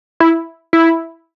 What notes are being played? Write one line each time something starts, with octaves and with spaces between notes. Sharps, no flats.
E4
E4